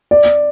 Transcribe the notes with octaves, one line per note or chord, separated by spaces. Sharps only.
D5